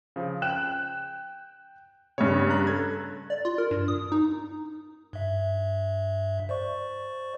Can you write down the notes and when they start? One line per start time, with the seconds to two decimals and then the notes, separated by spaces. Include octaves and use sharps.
0.16 C#3 F3
0.42 G5 F#6 E7
2.18 G2 C#3 C#5
2.50 A#5 F#6
2.67 A4 G#6
3.30 D5
3.45 F4
3.58 A#4
3.71 G2
3.88 D#6
4.12 D#4
5.13 G2 E5
6.49 C5 D5 C#6